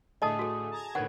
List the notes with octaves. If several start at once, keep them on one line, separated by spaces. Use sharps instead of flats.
A2 D3 A3 G#4 D#5 A5 D#6
F#4 A4
A5 A#5 G#6
A2 D3 D#3 A#4 B4 C#5 F#5